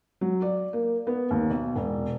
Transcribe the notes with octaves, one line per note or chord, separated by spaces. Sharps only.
F#3
D5
A#3
B3
D#2
B1
E1